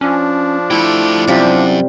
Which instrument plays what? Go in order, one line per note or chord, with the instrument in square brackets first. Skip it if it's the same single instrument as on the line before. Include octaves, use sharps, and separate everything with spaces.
[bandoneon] F3 D4 [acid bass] C#4
[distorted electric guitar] A3 G4 [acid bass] E4
[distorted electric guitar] F#2 [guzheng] C3 G3 F4